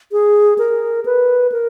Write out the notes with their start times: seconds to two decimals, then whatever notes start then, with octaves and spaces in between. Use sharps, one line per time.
0.12 G#4
0.58 A#4
1.05 B4
1.52 A#4